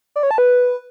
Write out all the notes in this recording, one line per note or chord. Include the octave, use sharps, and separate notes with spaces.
D5
C#5
A5
B4